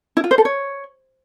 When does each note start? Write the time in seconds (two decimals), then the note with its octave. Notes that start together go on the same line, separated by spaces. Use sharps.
0.17 E4
0.24 F4
0.31 C5
0.38 A4
0.45 C#5